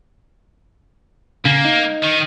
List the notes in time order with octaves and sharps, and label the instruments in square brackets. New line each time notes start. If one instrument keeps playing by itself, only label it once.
[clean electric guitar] C#3 [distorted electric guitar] A#3
[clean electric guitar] D#4
[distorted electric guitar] D#3